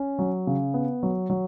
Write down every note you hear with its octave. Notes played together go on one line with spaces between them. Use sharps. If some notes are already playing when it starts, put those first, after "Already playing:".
Already playing: C#4
F#3
C#3
B3
F#3
F#3